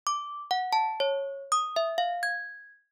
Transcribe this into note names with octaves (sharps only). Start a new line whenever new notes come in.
D6
F#5
A5
C#5
D#6
E5
F5
G#6